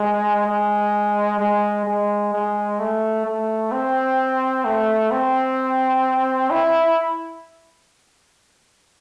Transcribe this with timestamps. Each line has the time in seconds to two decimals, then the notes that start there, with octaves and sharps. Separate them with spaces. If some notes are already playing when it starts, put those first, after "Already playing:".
Already playing: G#3
0.46 G#3
1.39 G#3
1.86 G#3
2.33 G#3
2.80 A3
3.26 A3
3.72 C4
4.65 A3
5.11 C4
6.51 E4